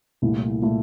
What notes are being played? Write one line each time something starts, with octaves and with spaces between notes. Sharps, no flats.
C2 A#2 A3 E4
A#2 A3 E4